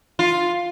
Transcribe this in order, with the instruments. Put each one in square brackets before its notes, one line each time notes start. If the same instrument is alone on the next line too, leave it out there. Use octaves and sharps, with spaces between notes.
[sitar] F4